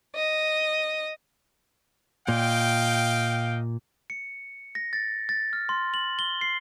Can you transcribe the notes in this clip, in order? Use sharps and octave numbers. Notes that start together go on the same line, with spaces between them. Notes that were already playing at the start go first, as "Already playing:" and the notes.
D#5
A#2 D#5 F5 G5
C#7
A#6
A6
A6
F6
C6
F#7
G7
C7